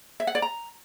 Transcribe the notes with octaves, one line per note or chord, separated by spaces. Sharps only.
E5
F#5
D5
A#5